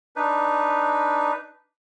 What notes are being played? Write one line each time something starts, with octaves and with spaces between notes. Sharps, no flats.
D4 D#4 B4